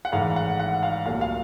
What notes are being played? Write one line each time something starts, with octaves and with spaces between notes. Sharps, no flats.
F#5
G#1 G#2 E3 A3 F5
F#5
F#5
F5
C2 A#2 F#3 A3 F5
F5